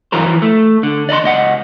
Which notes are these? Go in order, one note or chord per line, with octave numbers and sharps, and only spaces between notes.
G2 E3 F#3 A#4 C5
E3 F3
A3
D3
D5 D#5 A#5 C6
C#2 D#5 F#5